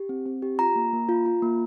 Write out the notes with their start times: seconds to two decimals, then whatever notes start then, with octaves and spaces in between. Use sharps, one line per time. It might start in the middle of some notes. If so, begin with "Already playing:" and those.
Already playing: G4
0.09 C4
0.26 C4
0.42 G4
0.59 F4 A#5
0.76 A#3
0.93 A#3
1.09 F4
1.26 F4
1.42 A#3